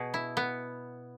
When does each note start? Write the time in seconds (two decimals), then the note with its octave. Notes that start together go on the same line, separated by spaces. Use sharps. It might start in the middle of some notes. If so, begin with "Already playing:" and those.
Already playing: B2 G#4
0.14 E4
0.37 B3